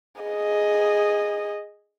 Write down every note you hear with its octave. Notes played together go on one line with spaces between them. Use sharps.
G#4 D#5